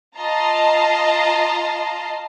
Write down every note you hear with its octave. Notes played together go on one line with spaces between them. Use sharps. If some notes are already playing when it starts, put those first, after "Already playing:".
F4 D#5 A5 A#5 C7